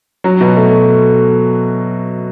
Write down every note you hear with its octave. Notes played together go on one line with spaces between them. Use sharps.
F#3
B2
A3